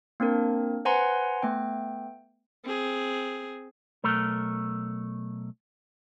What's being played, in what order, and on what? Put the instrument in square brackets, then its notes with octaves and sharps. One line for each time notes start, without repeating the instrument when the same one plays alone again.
[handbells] A#3 C4 D4 A#4
B4 C5 F#5 G#5 A#5 C6
A3 B3 G5
[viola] C4 G#4
[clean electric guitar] B1 A3 A#4